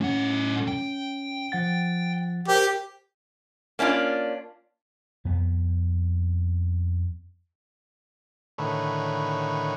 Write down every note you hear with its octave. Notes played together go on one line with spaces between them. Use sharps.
A2 C#4 F#5
G5
F3 F#5 A6
G4 A#4 C5
A#3 C#4 D4 E4 F4
F2 B3
A2 D3 D#3 B4 C#5